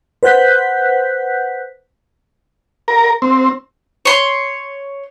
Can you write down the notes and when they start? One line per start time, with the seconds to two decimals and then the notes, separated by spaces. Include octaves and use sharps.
0.23 B4 C5 F#5 F#6 G6 B6
2.88 A#4
3.22 C4
4.05 C#5 C6